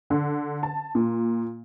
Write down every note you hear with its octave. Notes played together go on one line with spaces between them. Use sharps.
D3
A5
A#2